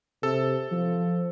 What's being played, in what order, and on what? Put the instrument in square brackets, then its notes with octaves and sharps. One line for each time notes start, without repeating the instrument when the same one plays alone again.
[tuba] C3 [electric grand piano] A4
[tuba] F3